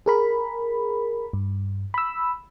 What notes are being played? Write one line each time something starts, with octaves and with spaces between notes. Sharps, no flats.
G#4 A#4 B5
G2
B5 E6